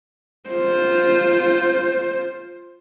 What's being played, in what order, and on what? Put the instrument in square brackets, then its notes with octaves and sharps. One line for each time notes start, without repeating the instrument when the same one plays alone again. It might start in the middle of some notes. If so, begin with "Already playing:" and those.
[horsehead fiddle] F4 C5